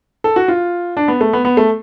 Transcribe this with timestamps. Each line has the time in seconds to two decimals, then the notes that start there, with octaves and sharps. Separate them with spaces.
0.24 A4
0.36 F#4
0.48 F4
0.97 D4
1.08 B3
1.21 A3
1.33 B3
1.45 B3
1.57 A3